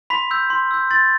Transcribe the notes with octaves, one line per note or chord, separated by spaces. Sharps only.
B5 C6 B6
E6 G6
C6
E6 G6
C6 A6